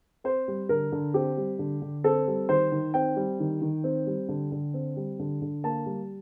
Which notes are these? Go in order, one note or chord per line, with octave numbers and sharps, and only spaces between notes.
C4 C5
G3
D3 A#4
D3
C4 G4
G3
D3
D3
C4 A4
G3
D#3 C5
D#3
C4 G5
G3
D#3
D#3
C4
G3
D3
D3
C4
G3
D3
D3
A#3 A5
G3